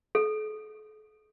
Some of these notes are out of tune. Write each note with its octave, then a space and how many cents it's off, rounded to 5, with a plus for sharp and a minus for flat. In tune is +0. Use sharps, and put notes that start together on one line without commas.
A4 -40